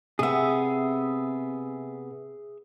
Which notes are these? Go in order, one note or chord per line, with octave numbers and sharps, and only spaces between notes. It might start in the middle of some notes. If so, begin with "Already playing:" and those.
C3 B3 G#4 E5